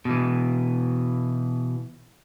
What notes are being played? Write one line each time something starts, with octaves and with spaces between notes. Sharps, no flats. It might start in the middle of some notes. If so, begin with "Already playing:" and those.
B2 E3